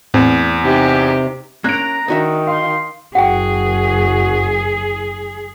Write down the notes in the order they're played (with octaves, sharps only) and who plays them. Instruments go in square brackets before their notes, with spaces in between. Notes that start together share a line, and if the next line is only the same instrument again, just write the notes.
[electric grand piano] E2 [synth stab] A2 C4
[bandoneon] C3 [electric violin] D#4 G4
[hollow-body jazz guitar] A#3 C#4 [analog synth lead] A#5 [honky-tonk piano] F#6 D7
[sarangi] D#3 [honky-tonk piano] D4 [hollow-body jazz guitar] D#4 F#4 E5
[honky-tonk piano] F5 [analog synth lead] C6
[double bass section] F#1 [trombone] F#4 [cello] G#4 [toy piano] F#5 G5